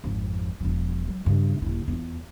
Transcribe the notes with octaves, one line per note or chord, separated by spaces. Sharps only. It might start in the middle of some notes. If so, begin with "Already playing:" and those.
G#1 F2
E1 F3
F#3
G2 C#3
D#1 E4
E2 F4